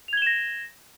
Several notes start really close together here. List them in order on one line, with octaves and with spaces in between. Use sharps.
F7 G#6 G7 E7 A#6